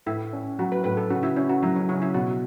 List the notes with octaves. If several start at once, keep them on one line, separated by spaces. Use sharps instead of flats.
A2 E4
C#4
F#3 F#4
B4
A2 B4
A4
C#3 F#4
E4
C#4 E4
F#4
F#3 E4
C#4
C#3 C#4
E4
B2 F#4